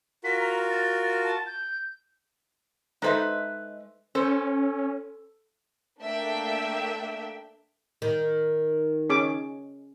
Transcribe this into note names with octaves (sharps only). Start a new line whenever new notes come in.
F4 F#4 A#4 B6
A#5
A6
A5
G6
G#3 D#4 A4 B4 C5 E5
C#4 A4 C5
A3 A#3 D4 E5 G5
D#3
C#4 G#4 D6